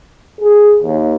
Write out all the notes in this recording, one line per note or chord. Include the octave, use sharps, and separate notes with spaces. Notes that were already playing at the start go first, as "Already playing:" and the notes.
G#4
D#2